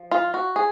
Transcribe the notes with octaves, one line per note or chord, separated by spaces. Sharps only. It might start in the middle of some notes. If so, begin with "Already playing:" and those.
Already playing: F3
F4
F#4
G#4